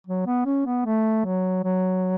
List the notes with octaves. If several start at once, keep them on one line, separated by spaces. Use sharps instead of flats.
F#3
B3
C#4
B3
A3
F#3
F#3